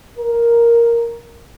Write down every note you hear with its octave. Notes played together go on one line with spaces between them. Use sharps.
A#4